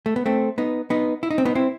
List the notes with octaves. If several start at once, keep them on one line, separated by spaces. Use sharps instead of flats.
A3
B3
A3 C4
B3 D#4
B3 D#4
E4
D#4
C4
B3 D#4
C4 E4